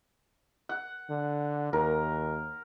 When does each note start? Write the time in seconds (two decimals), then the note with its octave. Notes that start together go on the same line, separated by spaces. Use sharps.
0.69 F#5
1.10 D3
1.73 D#2 A#4